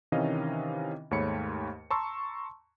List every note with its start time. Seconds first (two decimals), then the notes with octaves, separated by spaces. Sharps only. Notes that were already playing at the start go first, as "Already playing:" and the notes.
0.12 C3 D#3 E3 C#4 D#5 F5
1.11 D#2 G#2 A3 C#5 B5 C#7
1.91 A5 A#5 C6 C#6 E6